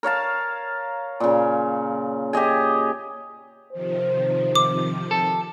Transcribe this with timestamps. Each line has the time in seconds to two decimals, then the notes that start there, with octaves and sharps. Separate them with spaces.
0.03 A#4 C#5 F5 A5
1.20 A#2 C#3
2.33 G4 G#4 D#5 G#5
3.72 C3 D#3 F3 C5
4.55 D6
5.11 A4